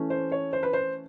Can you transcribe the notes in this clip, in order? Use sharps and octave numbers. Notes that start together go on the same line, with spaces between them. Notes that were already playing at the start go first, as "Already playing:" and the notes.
Already playing: E3 A3 C#4
C5
C#5
C5
B4
C5